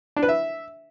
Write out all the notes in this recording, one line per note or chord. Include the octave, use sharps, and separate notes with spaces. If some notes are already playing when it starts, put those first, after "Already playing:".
D4
B4
E5